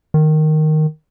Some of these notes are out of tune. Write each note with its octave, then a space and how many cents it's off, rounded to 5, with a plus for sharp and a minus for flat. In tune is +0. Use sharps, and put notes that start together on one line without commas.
D#3 -5